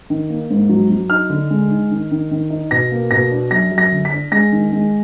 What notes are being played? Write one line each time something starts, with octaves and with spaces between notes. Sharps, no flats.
D#3
A#3
G#2
F#3
F#3
D#4 F6
D3
G#3
D#4
D#3
D#3
D#3
D#4
B2 A#6
A#3
B2 A#6
D4
F#2 A#6
F#2
A#6
D3
B6
D4
G#3 A#6
D#3
G#3